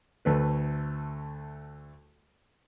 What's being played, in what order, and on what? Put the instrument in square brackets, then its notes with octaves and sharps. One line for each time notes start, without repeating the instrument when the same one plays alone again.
[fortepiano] D2 A3 B4